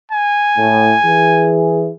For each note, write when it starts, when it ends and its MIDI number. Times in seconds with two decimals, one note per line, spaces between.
0.11 1.54 80
0.58 0.94 45
1.04 1.89 52
1.04 1.89 68